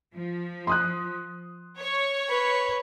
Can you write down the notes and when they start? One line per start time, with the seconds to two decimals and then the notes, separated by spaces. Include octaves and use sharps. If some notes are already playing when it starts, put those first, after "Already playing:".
0.15 F3
0.67 C6 D#6 F#6
1.79 C#5
2.29 B4